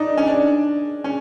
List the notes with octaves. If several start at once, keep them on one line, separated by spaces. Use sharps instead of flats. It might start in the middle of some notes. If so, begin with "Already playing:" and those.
Already playing: D4 D#4
C#4
D4
C#4